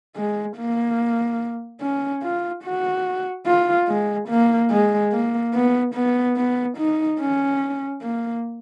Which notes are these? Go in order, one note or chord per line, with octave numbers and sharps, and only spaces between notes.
G#3
A#3
C#4
F4
F#4
F4
G#3
A#3
G#3
A#3
B3
B3
B3
D#4
C#4
A#3